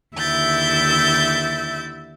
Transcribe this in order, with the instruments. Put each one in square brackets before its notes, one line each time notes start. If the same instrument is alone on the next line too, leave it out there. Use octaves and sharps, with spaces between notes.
[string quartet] D#2 D3 E4 E5 G6 A6